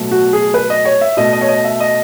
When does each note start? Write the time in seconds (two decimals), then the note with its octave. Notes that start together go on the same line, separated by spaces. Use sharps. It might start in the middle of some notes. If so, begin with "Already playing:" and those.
Already playing: B2 F#3 A3
0.11 F#4
0.33 G#4
0.54 B4
0.70 D#5
0.85 C#5
1.01 E5
1.17 B2 A3 D#5
1.33 D#5
1.41 C#5
1.48 D#5
1.64 E5
1.80 D#5